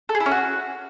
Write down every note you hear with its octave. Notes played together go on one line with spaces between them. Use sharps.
A4
G#4
E4
C#4
F#4